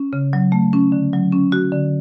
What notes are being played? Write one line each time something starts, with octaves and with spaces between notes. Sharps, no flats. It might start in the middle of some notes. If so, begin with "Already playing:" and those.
Already playing: C#4
C#3
F#3
A3
C#4
D3
F#3
C#4
F#4
D3